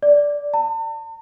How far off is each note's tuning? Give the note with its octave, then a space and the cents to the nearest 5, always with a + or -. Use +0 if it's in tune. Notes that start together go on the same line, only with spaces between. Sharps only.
D5 -5
A5 +40